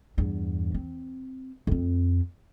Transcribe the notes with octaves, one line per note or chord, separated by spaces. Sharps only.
E2 G2
C4
F2 C4